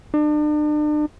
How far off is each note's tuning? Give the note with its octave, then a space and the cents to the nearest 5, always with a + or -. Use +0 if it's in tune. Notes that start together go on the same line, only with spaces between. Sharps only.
D4 +40